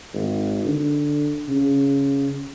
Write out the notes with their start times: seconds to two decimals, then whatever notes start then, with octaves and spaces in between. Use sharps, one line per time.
0.14 G#1
0.66 D3
1.49 C#3